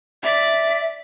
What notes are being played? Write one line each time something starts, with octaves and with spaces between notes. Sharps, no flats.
D5 E5